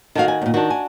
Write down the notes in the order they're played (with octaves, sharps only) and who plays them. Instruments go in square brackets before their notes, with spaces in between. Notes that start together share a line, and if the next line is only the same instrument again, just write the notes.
[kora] D#3 F#4 [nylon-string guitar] A4 D#5 F5
[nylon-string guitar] G#5
E2 A#2
[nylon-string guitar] D#3 [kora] D4 F#4
[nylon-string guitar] G#5